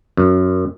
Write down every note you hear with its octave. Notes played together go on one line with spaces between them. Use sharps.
F#2